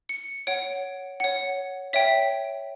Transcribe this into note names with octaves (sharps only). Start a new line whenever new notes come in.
C#7
C#5 F#5 D7
C#5 F#5 C#7
C#5 E5 G5 B6